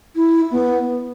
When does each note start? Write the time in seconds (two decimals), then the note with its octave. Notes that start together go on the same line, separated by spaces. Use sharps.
0.16 E4
0.51 B3